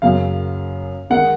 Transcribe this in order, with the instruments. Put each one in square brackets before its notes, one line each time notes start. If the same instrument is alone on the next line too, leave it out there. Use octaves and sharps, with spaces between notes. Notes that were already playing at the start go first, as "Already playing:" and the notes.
[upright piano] F#2 C#3 F#3 A#3 [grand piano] F5
[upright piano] D#3 G#3 D#4 A#4 [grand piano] F#5